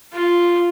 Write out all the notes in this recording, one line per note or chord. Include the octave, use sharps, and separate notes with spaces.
F4